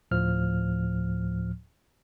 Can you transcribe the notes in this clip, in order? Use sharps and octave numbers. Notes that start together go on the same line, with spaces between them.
D2 A2 F3 F6